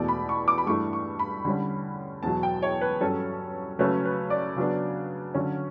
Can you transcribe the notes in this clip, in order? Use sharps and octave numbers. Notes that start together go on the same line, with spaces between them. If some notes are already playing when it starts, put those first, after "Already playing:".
Already playing: E2 B2 A3 D5
B5
C#6
D6
B5
G2 E3 A3 D4 C#6
C#6
B5
D3 G3 C#4
E2 B2 F#3 A5
G5
C#5
B4
G2 F#3 C#4 A4
C#3 F#3 A3 C#4 B4
B4
D5
C#3 F#3 B3 D4
D3 F#3 C#4